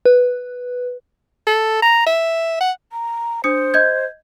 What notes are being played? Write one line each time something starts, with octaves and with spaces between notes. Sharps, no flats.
B4
A4
A#5
E5
F#5
A#5
D4 C5 D#6 C#7
D#5 G6 G#6